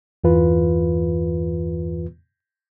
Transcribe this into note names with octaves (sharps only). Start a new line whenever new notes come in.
E2 G2 E3 F4 B4